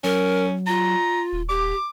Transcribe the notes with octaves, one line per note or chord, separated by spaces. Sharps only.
F#3 C#4 A#4
F4 A#5
D#1
G4 D6